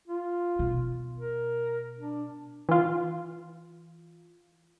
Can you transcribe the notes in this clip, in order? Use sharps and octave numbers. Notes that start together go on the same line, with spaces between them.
F4
B2
A#4
D4
E3 F4